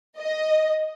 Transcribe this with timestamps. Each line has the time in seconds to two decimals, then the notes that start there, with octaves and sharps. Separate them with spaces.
0.18 D#5